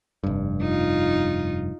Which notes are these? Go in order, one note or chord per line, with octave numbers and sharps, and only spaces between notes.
F1 G2
D#4 F4